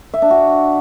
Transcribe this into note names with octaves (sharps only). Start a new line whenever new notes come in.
E5
D4
F#4